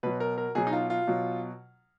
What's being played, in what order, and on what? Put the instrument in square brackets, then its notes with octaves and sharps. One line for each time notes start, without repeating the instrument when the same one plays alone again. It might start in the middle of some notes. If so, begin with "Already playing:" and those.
[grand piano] B2 F#3 B4
A#4
A#4
B2 F#3 G#4
D#4
F4
F4
B2 F#3